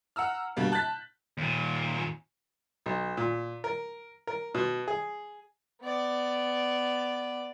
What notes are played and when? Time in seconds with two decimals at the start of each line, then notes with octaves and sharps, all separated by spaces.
0.16 F#5 A#5 E6 F6
0.57 B2 D3 G3 A#3
0.72 A5 F#6 G6 A6 B6
1.38 D#2 A#2
2.86 B1
3.17 A#2
3.64 A#4
4.27 A#4
4.54 B2
4.88 G#4
5.82 B3 D5